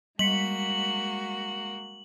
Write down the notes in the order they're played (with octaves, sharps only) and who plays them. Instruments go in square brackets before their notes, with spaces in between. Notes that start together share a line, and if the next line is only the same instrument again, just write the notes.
[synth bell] G3 B6 C#7 [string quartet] G#3 A#3 F#4 [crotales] F#7